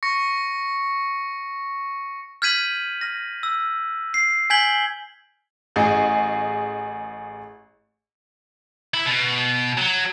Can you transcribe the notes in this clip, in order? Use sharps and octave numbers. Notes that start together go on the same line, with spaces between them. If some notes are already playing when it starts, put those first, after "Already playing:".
C#6 A#6 C#7
F6 G6 G#6 B6 D#7 F#7
F6 A#6
E6
C7
G#5 G6 G#6 B6 F#7 G7
A1 G#4 D#5
E4
B2
F#3